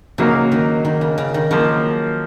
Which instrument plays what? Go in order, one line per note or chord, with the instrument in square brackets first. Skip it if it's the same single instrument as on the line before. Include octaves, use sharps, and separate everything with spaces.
[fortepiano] A#2 F#3 A#3 D#4 A#4 [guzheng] C#3
[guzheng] D#3
D#3
C#3
C#3
D#3
[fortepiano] C#3 F3 A#3 [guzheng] F#3